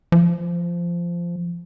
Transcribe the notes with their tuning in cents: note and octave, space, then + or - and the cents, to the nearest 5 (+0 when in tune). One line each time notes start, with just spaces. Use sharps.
F3 -15